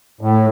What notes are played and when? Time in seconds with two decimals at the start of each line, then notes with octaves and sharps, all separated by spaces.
0.21 A2